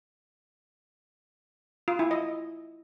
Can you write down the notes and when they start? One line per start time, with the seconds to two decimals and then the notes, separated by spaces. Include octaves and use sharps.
1.88 F4
1.99 E4
2.11 D#5